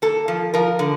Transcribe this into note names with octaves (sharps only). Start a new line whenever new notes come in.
A#3 A4
F3
F3 A#4
D3